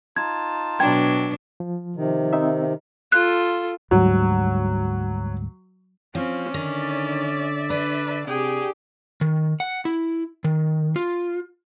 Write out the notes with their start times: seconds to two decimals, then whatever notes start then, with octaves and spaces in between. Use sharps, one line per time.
0.17 D#4 F4 A5 G#6
0.80 B2 F#3 D4 G5 G#6
1.60 F3
1.96 C3 D#3
2.33 C4 D#4 E5
3.12 F4 A4 F#6
3.91 D2 G#2 F#3 G3
6.15 F3 C4 C#4
6.54 D3 D#3 D5 E5
7.70 D4 B4
8.27 C3 G4 G#4 G5
9.21 D#3
9.60 F#5
9.85 E4
10.44 D#3
10.96 F4